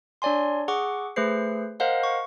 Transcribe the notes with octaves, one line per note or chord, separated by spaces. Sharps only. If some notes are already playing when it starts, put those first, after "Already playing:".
D4 C#5 D5 G#5 C6
G#4 F#5 C#6 D6
A3 G#4 B4 C5 C7
A#4 C5 D#5 F5 F#5
C#6